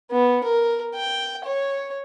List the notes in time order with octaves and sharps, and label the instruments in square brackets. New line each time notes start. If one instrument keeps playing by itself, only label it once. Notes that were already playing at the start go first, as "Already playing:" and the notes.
[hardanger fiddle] B3
A#4
G5
C#5